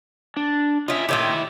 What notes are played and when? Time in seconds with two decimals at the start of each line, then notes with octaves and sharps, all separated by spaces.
0.37 D4
0.88 C#4 F4 D#5 E5
1.09 A#2 D#3 E4 G4 C#5 E5